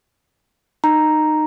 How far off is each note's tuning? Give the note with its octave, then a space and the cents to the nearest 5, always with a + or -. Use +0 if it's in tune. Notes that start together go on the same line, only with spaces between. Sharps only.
D#4 -25 A#5 +0